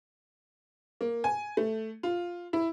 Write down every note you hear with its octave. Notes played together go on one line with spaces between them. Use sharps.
A#3
G#5
A3
F4
E4